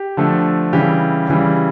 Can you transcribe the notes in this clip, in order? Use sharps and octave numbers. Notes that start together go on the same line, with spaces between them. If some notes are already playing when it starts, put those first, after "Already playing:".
Already playing: G4
D3 F3 A3
C#3 E3 G3 G4
C#3 E3 G3